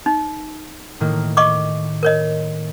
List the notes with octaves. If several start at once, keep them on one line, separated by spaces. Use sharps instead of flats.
D#4
A2 D#3 A#3
D#5 C#6 D6
A#4 C#5 D#5